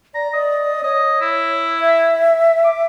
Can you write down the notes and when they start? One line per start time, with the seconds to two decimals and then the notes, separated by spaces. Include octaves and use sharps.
0.15 D5 A#5
0.33 D5 D#5
0.84 C#5 D#5
1.21 E4
1.80 E5
2.65 D6